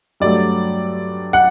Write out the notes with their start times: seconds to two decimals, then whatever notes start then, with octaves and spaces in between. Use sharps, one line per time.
0.20 G2 F#3 A3 D5
1.33 F#5